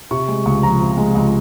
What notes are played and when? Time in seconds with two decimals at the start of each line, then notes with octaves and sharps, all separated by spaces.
0.11 C3 C#6
0.28 G#3
0.46 C#2 C#6
0.62 F3 A#5
0.81 C3
0.97 G#3
1.15 C#2